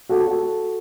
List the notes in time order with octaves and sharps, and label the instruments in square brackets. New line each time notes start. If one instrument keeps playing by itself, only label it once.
[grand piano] F#4 A4
F#4 A4